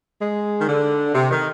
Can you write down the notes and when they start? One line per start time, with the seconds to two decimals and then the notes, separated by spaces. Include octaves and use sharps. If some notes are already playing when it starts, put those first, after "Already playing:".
0.20 G#3
0.60 D#3
0.67 D3
1.14 C3
1.30 D#3